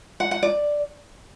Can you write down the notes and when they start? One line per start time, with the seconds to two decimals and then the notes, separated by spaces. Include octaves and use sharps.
0.20 F#5
0.31 F#5
0.43 D5